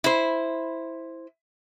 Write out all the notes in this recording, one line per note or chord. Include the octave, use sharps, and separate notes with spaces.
E4 C5